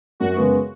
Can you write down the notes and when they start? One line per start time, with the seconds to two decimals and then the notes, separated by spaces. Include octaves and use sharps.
0.20 F#2 F#4
0.37 C#3 G#3 B3